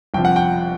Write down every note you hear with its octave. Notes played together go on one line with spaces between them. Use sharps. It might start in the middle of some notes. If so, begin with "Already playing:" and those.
G1 F2 C3 F3 G5
F#5
G5